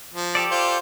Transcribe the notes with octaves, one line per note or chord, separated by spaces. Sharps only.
F3
G4 A4 D5
F4 C5